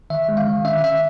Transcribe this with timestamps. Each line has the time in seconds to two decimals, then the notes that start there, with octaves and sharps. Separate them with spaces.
0.10 D#3 E5
0.29 G#3
0.37 F5
0.46 D#3
0.65 C#4 E5
0.83 D#3 E5